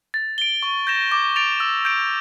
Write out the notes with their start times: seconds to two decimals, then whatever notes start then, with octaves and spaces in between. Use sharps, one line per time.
0.14 A6
0.38 D7 G7
0.63 C#6
0.87 G6 A#6 E7
1.12 D6
1.36 A6 D7 F7
1.60 E6
1.85 G6 D7